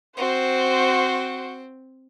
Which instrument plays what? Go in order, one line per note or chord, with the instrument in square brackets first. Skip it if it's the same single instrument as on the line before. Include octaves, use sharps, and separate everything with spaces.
[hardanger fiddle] C4 [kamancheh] F#4 C5